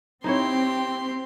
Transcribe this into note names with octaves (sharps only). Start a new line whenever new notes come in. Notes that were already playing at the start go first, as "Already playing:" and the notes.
C4 D#4 E4 G4 C#5 C6